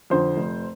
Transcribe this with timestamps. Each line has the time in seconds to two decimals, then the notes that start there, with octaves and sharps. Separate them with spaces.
0.10 F2 D3 C5
0.37 F1